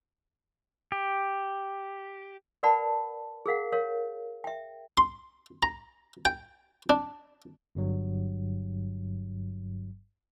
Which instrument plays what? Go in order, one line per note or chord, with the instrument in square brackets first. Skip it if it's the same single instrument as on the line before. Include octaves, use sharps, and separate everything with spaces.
[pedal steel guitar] G4
[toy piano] A#4 B4 D5 F#5 A5 B5
G#4 A#4 F5 F#5
A#4 C#5 F5
E5 G5
[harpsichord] C6
A#5
G5
D4
[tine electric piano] G1 G2 F#3